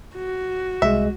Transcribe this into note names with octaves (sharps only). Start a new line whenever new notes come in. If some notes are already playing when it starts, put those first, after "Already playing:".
F#4
C2 G#3 E5